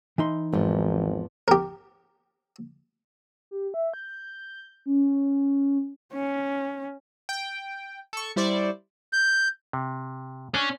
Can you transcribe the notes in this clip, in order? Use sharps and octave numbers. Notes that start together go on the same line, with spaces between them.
E3 D#4 C6
G#1 E2 G#2 F3
G4 A#4
G4
E5
G6
C#4
C#4
G5
A4 C#6
G3 E4 C5 D5 C#6
G6
C3
C#4 D4